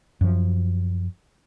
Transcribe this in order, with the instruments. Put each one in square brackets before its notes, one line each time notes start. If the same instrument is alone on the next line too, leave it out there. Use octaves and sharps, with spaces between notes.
[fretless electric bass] F#2 F3